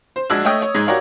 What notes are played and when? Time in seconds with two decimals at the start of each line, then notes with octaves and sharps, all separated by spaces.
0.16 C5
0.30 A#1 G#3 D4 F#4 E6 G#6
0.44 A3 C#5 D#5 G5 D#6
0.62 C#5
0.74 G#2 G#3 D#4 G#6
0.87 F#4 G4 A#4 C#5 D5 F5